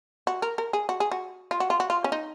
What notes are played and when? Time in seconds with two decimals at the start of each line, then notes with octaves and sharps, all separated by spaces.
0.27 F#4
0.42 A#4
0.58 A#4
0.73 G#4
0.89 F#4
1.00 G#4
1.12 F#4
1.51 F4
1.60 F#4
1.70 F4
1.80 F#4
1.90 F4
2.04 C#4
2.12 D#4